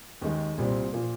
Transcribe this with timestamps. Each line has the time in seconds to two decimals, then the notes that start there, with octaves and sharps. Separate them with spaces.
0.22 D#2 D#3 G#3
0.57 C2 A#2 G3 C4
0.93 A#2 F3 A#3